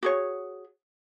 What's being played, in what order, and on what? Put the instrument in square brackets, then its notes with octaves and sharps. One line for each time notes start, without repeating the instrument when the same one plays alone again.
[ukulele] F#4 G#4 C#5